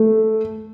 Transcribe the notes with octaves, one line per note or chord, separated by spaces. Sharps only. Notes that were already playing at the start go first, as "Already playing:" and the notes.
Already playing: A3